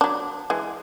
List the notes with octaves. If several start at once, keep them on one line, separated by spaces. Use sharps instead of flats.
F#3 D4
E3 G#3